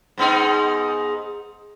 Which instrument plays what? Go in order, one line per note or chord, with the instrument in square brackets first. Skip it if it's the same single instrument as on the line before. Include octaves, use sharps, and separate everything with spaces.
[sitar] G#2 B3 D#4